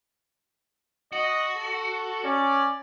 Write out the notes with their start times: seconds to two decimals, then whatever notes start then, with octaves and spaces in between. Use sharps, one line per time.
1.13 F#4 D#5
1.56 A4
2.24 C#4 D5